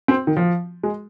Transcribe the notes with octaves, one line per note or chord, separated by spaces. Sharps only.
C4
D#3
F3
G#3